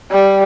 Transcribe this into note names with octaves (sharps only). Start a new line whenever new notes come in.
G3